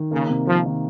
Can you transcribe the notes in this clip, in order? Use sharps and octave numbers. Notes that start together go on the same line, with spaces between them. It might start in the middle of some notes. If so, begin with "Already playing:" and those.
Already playing: D#3
C#3 A#3
C3
F3 A#3
D#3